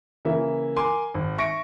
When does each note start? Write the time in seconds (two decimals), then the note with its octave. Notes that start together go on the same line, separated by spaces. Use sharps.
0.25 C#3 E3 A#3 E5
0.76 A#4 G#5 C6 D6
1.15 G#1
1.38 E5 C#6 A#6 C#7 D7